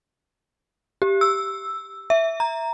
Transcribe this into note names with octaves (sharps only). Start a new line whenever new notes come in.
G4
E6
E5
A#5